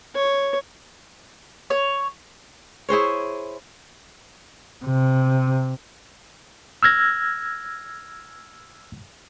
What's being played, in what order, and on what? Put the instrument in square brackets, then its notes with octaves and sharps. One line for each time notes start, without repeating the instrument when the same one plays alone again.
[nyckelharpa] C#5
[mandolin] C#5
[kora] E4 G#4 C5 C#5
[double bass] C3
[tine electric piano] E6 F6 G#6 A#6